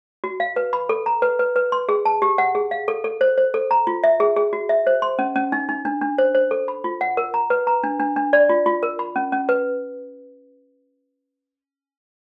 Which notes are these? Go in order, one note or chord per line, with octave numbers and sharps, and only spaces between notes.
F#4
F5
B4
B5
A4
A#5
B4
B4
B4
C6
G#4
A5
G4
F#5
G#4
F5
A4
A4
C5
C5
A4
A#5
F4
E5
G#4
G#4
F#4
E5
C5
C6
C#4
C#4
D#4
D#4
D4
D4
C5
C5
A4
B5
F4
F#5
A#4
A#5
B4
A#5
D4
D4
D4
D5
F4
F4
A#4
B5
C#4
C#4
B4